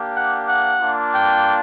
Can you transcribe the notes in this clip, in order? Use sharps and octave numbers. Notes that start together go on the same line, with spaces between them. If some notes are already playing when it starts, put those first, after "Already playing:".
Already playing: A#3 D4 G4
F#5
F#5
A#3 D4 F4
G5